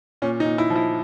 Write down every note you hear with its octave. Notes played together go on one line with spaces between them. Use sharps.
A#2 C#4
D#4
A#2
E4
F3
E4